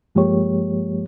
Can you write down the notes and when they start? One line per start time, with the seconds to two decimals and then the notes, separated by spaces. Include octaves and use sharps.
0.15 G2 F3 G#3 A#3 G4 C#5